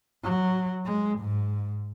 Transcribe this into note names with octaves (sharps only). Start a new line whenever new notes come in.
F#3
G#3
G#2